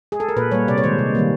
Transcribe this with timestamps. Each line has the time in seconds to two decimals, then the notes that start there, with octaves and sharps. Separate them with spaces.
0.12 G#4
0.20 A4
0.29 A#4
0.36 A#2 B4
0.51 G3 A#3 C#5
0.68 C3 D5
0.78 C#5
0.84 D#3 G#3 C5
0.99 C3
1.15 D#3 G3 A#3